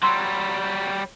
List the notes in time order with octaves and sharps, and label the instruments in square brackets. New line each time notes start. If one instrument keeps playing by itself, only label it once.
[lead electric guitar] F#3 G3 [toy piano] C6 E6